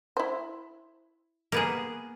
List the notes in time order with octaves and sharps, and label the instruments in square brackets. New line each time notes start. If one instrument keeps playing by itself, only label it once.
[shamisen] E4 C5
[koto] A#3 B3 G#4